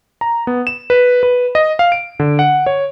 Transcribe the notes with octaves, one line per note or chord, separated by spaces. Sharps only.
A#5
B3
E7
B4
B4
D#5
F5
D7
D3
F#5
C#5